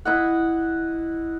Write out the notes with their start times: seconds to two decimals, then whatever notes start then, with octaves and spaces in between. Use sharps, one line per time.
0.05 E4 D#5 F#5